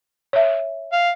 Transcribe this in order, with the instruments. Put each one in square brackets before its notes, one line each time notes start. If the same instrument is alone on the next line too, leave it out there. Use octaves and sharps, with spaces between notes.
[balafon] C#5 E5
[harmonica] F5